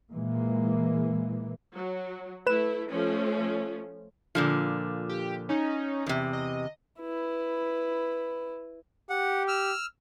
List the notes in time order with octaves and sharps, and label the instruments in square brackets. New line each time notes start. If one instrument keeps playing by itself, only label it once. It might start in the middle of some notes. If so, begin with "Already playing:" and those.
[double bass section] A#2 E3 G#3 A#3
[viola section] F#3
[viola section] A3 E4 [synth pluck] B4 E7
[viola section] F3 A3 C#4
[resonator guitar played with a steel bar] A#2 D3 F3
[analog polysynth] G4
C#4 D#4
[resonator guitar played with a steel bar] E2 C3
[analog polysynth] D#5
[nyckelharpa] E4 B4
[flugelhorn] G4 [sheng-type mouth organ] F#5
[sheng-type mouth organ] E6 F6